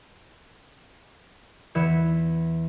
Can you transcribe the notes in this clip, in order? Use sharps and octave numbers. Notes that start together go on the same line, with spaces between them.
E2 E3 E5 G#6 C#7